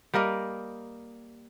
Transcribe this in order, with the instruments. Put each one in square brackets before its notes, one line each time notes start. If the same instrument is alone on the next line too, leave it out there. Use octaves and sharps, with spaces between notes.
[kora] G3 A#3 A#4 D#5